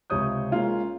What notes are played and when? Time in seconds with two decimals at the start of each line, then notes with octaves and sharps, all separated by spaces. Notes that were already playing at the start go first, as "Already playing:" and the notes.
0.10 C#2 C3 C#5 D#6 G6
0.52 G#3 A#3 C#4 F4 F5